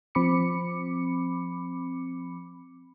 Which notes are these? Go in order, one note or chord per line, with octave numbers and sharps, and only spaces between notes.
F3 C4 B5 D6 C#7